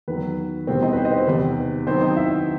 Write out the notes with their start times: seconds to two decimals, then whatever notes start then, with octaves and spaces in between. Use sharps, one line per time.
0.08 E2 D#3 F#3 B4
0.67 E2 B2 G3 B3 C4 E4 C5
0.82 D#4 D#5
0.93 B4
0.97 C4 C5
1.05 D#5
1.12 C4 C5
1.27 E2 C3 D#3 B4
1.87 D#3 F#3 B3 C4 C5
2.01 D#4 D#5
2.17 E4 E5